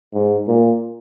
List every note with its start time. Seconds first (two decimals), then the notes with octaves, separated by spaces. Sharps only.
0.14 G#2
0.48 A#2